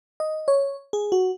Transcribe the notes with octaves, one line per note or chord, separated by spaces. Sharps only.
D#5
C#5
G#4
F#4